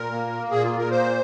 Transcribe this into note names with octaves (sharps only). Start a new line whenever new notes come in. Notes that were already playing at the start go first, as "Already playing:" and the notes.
Already playing: A#2 A#4
A#3
A#3
A#2 G#4
F4
A#2
A#4
A#3 C5